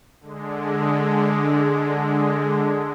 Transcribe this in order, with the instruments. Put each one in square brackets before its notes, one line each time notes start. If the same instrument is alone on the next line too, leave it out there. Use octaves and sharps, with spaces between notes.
[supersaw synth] D3 G#3